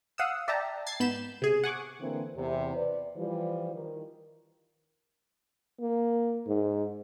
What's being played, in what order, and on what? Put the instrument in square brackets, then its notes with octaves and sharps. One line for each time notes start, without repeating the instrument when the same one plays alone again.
[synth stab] F5 F#5 D#6 E6
D5 E5 G5 A5 A#5
G#6 A6 C7
G#2 B3 B5 G6 E7
C3 G#4
F#5 G#5 C#6 D6
[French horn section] D3 E3 A#3 C4
E2 C3
B4 D5
E3 F3 G3
D#3
[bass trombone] A#3
G#2